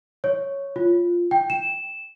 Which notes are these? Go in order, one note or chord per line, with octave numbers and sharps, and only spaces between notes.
C#5
F4
G5
E7